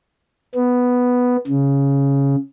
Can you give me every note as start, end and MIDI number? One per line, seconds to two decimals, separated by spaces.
0.55 1.37 59
1.47 2.36 49